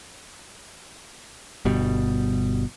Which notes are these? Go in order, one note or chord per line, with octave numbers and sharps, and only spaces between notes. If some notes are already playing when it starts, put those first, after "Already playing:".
G1 B2 G3